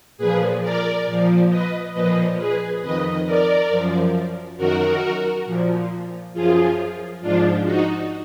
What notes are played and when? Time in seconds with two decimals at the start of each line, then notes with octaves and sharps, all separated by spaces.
0.18 A#2 F3 G#4 B4
0.62 A#4 D5
1.06 A#2 F3
1.50 B4 D#5
1.94 A#2 F3 B4 D#5
2.38 G#4 B4
2.82 F2 D#3 B4 D#5
3.26 A#4 D5
3.70 F#2 F3
4.58 F#2 D#3 F#4 A#4
5.46 A#2 F3
6.34 F#2 F3 F4 G#4
7.22 G#2 F3 D4 F4
7.66 D#4 F#4